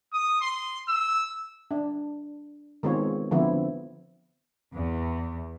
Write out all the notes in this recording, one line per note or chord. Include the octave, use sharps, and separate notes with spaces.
D#6
C6
E6
D4
D#3 G#3 B3 C4 F4 C#5
D3 F3 B3 C4 E4
E2